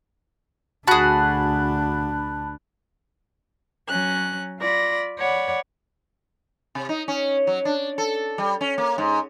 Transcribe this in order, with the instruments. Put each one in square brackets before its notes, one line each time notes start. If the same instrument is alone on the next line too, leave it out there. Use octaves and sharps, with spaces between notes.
[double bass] D2 D4 [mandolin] F#4 G#4 [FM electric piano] A5 B5 F#6
[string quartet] F#3 C#4 F#6
F4 D5 B5 A#6
C#5 D5 F#5 B5
[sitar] C3
D#4
C#4
F#3
D4
A4
G3
C#4
A#3
G#2